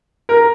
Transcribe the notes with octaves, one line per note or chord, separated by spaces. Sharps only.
A#4